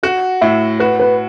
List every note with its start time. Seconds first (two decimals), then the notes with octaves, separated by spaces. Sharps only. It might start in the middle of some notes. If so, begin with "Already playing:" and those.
0.03 F#4 F#5
0.41 A2 E5
0.80 F#4 B4
0.99 B4